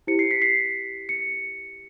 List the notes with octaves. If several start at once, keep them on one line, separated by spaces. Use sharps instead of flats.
E4 G4 C5 C#7
C7
B6
C7
C#7